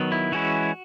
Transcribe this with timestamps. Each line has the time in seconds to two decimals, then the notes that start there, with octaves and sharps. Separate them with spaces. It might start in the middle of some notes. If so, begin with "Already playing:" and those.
Already playing: D#3 F#3 B3
0.12 E4
0.32 E3 G#3 C#4 E4 F#4